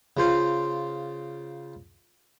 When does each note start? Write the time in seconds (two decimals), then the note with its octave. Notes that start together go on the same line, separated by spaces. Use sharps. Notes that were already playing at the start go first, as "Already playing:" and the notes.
0.17 C#3 F4 C5